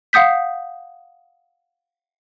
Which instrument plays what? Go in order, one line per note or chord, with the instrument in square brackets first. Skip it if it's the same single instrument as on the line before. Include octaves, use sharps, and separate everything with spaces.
[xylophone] F5 F#5 D#6 G6 B6